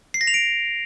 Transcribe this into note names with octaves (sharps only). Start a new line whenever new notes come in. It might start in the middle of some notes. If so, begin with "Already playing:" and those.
C7
A#6
F7
D7